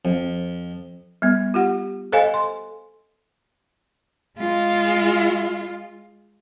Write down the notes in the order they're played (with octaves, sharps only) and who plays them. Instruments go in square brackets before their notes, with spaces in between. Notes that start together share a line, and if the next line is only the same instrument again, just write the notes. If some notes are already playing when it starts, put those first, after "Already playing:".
[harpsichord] F2
[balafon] G3 B3
F4 G4 F#5
A4 C5 D#5 F5 G#5
C6
[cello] G#3 F4